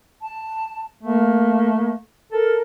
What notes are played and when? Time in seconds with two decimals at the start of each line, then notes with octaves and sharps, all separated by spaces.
0.22 A5
1.03 A3 A#3
2.32 A4 A#4